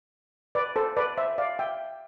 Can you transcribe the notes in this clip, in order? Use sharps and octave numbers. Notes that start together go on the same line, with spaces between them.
B4 D5
A4 C5
B4 D5
C5 E5
D5 F5
E5 G5